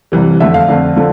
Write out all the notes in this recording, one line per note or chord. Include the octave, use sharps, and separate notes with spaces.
C2 C3 E3 G3
F2 D3 A3 E5
F5
F2 D3 A3
D3 F3 A3